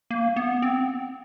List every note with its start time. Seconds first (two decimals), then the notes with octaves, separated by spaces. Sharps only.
0.10 A#3
0.36 B3
0.62 C4